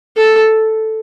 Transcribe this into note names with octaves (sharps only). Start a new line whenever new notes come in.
A4